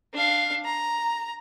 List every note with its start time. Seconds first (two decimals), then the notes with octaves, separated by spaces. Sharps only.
0.14 D4 F5
0.65 A#5